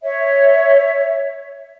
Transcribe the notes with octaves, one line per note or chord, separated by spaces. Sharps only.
C#5 E5